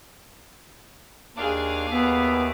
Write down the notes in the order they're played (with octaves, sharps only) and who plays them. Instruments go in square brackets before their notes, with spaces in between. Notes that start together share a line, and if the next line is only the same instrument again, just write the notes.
[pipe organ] D#2 D4 D6 [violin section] G#4 F5
[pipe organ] D#2 E5 D6 [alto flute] B3